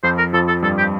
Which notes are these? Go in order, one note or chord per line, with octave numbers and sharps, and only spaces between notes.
F2 F3 C5
A#4
F2 F3 A4
A4
G2 G3 A4
G4